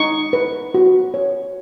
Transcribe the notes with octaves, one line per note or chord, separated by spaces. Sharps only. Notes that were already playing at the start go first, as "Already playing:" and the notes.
Already playing: D#4 C#6
B4
F#4
C#5